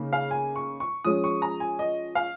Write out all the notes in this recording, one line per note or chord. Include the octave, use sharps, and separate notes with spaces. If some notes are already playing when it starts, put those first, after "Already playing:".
Already playing: C#3 A#3 D#4
F5
G#5
C#6
C#6
F3 G#3 C#4 D#6
C#6
A#5
G#5
D#5
F5